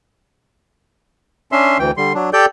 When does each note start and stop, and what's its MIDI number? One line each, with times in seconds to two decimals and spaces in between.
1.52 1.78 61
1.52 1.78 62
1.52 1.78 76
1.52 1.78 84
1.79 1.91 38
1.79 1.91 52
1.79 1.91 79
1.97 2.13 50
1.97 2.13 55
1.97 2.13 84
2.15 2.30 54
2.15 2.30 62
2.33 2.46 67
2.33 2.46 69
2.33 2.46 74
2.33 2.46 79
2.33 2.46 91